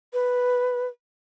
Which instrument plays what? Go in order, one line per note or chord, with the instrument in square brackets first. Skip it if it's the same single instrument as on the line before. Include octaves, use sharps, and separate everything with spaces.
[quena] B4